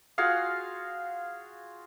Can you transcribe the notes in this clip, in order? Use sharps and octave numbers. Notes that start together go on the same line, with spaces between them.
F4 F#4 G#4 F5